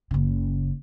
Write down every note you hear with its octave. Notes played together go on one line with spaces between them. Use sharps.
F#1 C#3